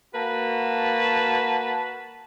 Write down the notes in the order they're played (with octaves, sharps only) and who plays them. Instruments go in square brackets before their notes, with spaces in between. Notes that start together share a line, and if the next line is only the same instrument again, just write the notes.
[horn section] A#3 F#4 B4 A5